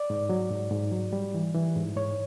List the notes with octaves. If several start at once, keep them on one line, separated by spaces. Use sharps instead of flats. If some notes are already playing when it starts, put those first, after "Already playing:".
Already playing: D5
G#2
F#3
G#2
G#2
F#3
G3
E3
E3
G#2
G#2 C#5